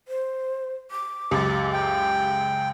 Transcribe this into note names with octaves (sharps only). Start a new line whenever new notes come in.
C5
D6
C#2 F#2 G4 A6
G5